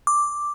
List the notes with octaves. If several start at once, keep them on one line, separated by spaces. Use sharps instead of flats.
D6